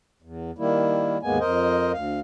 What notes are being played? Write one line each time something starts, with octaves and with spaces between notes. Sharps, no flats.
E2
D#3 G3 A#3 E4
D#2 G#2 G#3 A#3 B3 G#5
F2 A#4 C5 D#5
D2 F5